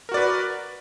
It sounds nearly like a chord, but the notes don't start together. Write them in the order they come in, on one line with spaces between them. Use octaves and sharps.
A#4 F#4 D5 B4